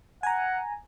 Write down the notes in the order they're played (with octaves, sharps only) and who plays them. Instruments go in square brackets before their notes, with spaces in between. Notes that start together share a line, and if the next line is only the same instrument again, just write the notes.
[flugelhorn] F#5 [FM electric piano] G#5 A#5